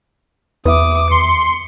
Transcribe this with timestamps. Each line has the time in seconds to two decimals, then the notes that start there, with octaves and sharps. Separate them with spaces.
0.65 E2 B4 E5 D6 D#6
1.11 D#2 C6 C#7